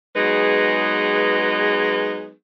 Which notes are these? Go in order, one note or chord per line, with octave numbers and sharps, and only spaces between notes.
F#3 G#3 B3 D#4 G#4 B4